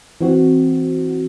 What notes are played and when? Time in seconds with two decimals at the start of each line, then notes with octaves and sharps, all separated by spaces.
0.21 E3 C4 F#4